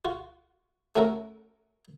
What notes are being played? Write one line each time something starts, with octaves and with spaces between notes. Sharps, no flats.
F4 F#4
A3 C#4 F#4 A4 A#4